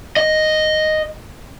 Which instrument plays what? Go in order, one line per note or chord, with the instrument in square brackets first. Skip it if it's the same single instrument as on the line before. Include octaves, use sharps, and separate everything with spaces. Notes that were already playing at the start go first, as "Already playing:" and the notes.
[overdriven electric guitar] D#5